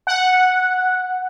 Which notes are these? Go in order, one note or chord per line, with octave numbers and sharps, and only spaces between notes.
F#5